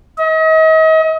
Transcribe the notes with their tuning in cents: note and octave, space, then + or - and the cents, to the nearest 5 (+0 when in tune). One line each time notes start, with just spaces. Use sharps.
D#5 +40